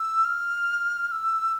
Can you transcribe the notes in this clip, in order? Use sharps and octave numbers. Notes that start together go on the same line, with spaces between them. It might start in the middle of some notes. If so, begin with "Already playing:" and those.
Already playing: E6
F6
F6
E6